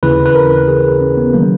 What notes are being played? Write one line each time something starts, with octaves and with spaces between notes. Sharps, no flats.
D#2 C#3 E3 B4
B4
A#4
G#4
C#4
B3
D#3 F#3 A#3